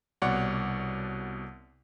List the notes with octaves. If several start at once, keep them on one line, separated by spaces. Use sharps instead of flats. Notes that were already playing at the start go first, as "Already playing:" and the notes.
C2 B2 C#5 D5 F#5 D6